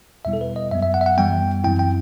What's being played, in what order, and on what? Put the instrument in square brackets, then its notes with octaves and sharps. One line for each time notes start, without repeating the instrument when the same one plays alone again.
[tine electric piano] E2 B2 G3 B3 E4 E5
A4
B4
D#5
F#2 F#3 B3 E5
E5
F#5
E5
F#5
F#2 E3 G3 B3 G5
F#2 F#3 C4 E4 G5
G5